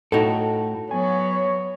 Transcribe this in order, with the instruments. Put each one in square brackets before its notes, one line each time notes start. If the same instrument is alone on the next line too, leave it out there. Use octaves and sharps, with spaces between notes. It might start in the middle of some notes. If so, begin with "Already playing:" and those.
[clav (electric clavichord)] A2 [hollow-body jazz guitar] D#4 F#4 A4
[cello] F#3 B3 [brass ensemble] C#5 [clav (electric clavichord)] G#5